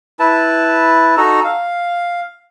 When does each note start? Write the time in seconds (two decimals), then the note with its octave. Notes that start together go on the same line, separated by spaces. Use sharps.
0.20 E4 B4 A5
1.17 D#4 F#4 A4 A#5
1.44 F5